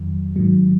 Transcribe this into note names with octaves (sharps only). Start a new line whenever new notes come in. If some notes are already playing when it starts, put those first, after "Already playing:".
Already playing: F2 D#3 F#3
G#2 D#3 F#3